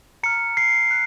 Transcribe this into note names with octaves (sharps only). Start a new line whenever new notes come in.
A#5 F6 C#7
C7
F#6